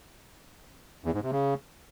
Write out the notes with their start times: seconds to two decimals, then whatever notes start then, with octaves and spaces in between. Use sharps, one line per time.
1.05 E2
1.14 G#2
1.23 C3
1.32 C#3